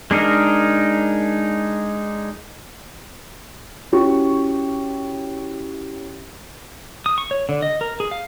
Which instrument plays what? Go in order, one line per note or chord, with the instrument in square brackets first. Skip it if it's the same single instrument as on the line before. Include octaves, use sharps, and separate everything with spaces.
[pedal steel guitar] G#3 D4 D#4 A#4
[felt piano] C#4 E4 F#4 G4 C#6
[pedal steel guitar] D#6
C#6
C#5
D3
D#5
A#4
G#4
F5